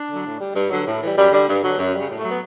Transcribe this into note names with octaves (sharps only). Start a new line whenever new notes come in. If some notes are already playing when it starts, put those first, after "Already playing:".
Already playing: D4
D3 F#3
A2
G3
G2
D3 F#3
A2
E3 G3
F#2 G3
D3 G3
G2
D3 F#3
F#2
C#3 G3
A2
A3
F#3
B3